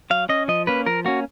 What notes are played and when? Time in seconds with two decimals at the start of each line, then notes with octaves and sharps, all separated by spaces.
0.10 F#3 F5
0.29 C#4 D#5
0.48 F3 D#5
0.67 A#3 C#4 B4
0.86 F3 A#4
1.05 A#3 C#4 F#4